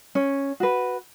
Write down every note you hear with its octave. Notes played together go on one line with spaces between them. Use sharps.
C#4
F#4 B4